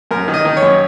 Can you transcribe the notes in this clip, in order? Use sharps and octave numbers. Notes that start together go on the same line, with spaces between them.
F#2 A#4
D#3
D#5
D#3
C#5
F#2